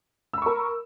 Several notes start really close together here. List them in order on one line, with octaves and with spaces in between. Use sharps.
E6 B5 C#6 A#4